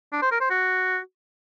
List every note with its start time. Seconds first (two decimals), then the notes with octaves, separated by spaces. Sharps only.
0.13 D4
0.22 C5
0.31 A#4
0.41 C5
0.50 F#4